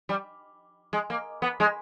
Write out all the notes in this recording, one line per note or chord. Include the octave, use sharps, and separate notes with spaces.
G3
G#3
A#3
B3
G#3